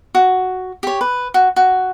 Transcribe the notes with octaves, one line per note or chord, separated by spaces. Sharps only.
F#4
G4 C#5
B4
F#4
F#4